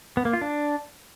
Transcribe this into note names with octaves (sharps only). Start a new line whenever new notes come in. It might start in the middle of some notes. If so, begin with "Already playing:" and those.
B3
A#3
F4
D4